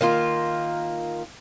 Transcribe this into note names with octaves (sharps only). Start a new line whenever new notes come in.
D#3 A#3 F4